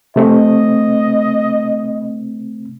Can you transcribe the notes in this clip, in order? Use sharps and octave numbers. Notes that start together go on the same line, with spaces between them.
C3 A3 C4 D#5